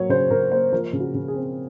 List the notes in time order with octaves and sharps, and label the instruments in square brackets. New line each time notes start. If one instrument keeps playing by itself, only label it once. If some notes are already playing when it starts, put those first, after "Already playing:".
Already playing: [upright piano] F#3 A#3 C#5
C#3 C5
C#3 A#4
A#3 C5
F3 A#4
C#3
F#4
C#3
G#4
C4